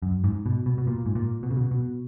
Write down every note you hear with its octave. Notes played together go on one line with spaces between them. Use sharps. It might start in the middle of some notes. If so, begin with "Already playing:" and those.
F#2
G#2
B2
B2
B2
A#2
G#2
A#2
B2
C#3
B2
B2